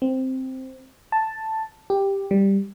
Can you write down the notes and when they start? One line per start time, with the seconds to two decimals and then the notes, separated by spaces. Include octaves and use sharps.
0.02 C4
1.12 A5
1.90 G4
2.31 G3